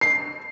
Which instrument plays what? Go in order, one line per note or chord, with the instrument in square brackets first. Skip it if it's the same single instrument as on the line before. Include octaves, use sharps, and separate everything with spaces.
[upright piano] C7